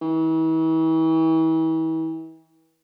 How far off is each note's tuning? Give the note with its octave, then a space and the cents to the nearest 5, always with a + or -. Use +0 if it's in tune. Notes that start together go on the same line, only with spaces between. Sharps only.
E3 -40